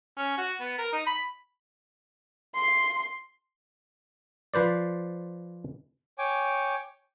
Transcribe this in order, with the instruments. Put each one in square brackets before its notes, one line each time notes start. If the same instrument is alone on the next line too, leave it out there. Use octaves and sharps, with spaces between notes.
[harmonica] C#4
F#4
B3
A#4
D#4
B5
[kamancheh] C6
[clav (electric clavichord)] F3 B4 C5 D5
[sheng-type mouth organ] C#5 G5 G#5 D6